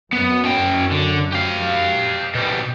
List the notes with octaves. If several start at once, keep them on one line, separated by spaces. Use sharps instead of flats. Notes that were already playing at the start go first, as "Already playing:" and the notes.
F#2 B3
C#4 G5
D3
G4 F5
B2 G3